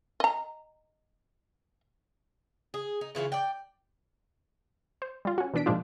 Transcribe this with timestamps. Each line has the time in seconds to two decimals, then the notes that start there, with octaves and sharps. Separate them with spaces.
0.20 D#5 A#5
2.74 G#4
3.01 D#4
3.15 C#3 E3 F4 C#5
3.32 D5 G5
5.02 C5
5.25 G3 F4
5.38 C#4 F#4
5.54 B2 E3 D4 B6 D7
5.66 A#2 F3 G#3 D4 F4